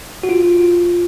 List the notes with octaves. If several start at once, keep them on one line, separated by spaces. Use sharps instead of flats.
F#4
F4